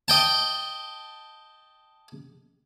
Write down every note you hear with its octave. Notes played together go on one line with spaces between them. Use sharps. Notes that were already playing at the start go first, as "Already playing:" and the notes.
D#5 G5 A5